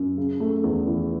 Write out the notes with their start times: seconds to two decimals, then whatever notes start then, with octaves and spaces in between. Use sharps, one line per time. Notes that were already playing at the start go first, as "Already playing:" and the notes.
Already playing: F#2
0.17 C#3
0.40 A3
0.63 E2
0.86 E3